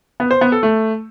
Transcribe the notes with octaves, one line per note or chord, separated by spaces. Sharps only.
B3
C5
B3
A4
A3